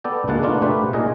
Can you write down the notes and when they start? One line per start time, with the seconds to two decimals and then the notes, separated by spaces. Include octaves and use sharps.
0.04 B3 A4 D5 G5
0.28 D2 A#2 G#3 A#3 F#5 A5
0.42 D#3 A3 B3 D4 F4
0.62 A3 G4 B4 C5
0.93 A#2 D#4 G#4 D#5